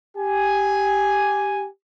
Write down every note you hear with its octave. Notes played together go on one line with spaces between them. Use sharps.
G4 G#5